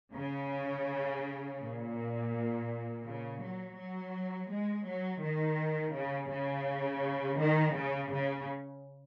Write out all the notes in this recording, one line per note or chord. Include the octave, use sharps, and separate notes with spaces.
C#3
A#2
C#3
F#3
F#3
G#3
F#3
D#3
C#3
C#3
D#3
C#3
C#3